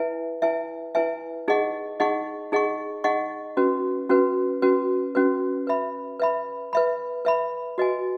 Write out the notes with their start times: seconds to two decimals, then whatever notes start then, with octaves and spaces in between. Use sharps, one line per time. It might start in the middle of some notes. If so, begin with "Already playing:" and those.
Already playing: E4 B4 E5 G#5
0.42 E4 B4 E5 G#5
0.95 E4 B4 E5 G#5
1.48 D#4 G#4 D#5 F#5 C#6
2.00 D#4 G#4 D#5 F#5 C#6
2.52 D#4 G#4 D#5 F#5 C#6
3.04 D#4 G#4 D#5 F#5 C#6
3.57 C#4 F#4 B4
4.09 C#4 F#4 B4
4.62 C#4 F#4 B4
5.15 C#4 F#4 B4
5.67 B4 E5 B5
6.20 B4 E5 B5
6.73 B4 E5 B5
7.25 B4 E5 B5
7.78 F#4 B4 D#5 G#5